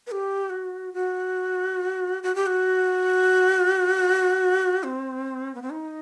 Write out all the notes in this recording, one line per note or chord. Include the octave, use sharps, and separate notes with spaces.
B4
G4
F#4
F#4
F#4
G4
F#4
C4
B3
C4
D#4